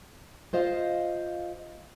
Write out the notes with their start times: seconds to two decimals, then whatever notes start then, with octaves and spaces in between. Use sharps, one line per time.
0.53 F4 C5 D#5 F5